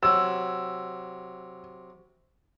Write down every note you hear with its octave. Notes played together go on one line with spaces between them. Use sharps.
C3 F#3 E6